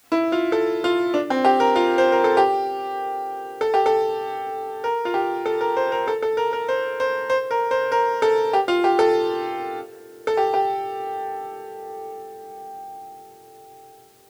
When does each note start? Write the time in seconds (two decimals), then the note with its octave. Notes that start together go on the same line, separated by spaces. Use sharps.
0.12 E4
0.32 F4
0.52 A4
0.84 F4
1.14 D4
1.30 C4
1.45 G4
1.60 A#4
1.76 F4
1.98 C5
2.12 A#4
2.24 A4
2.37 G4
3.61 A4
3.74 G4
3.86 A4
4.84 A#4
5.05 F4
5.14 G4
5.46 A4
5.61 A#4
5.77 C5
5.92 A#4
6.08 A4
6.22 A4
6.37 A#4
6.53 A#4
6.69 C5
7.00 C5
7.30 C5
7.51 A#4
7.71 C5
7.92 A#4
8.22 A4
8.53 G4
8.68 F4
8.84 G4
8.99 A4
10.27 A4
10.37 G4
10.54 G4